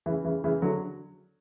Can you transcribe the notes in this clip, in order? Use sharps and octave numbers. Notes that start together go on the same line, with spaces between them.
C#3 E3
C#3 E3
C#3 E3
D3 F#3